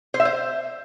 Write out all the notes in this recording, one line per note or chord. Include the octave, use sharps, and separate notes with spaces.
C5
E5
C5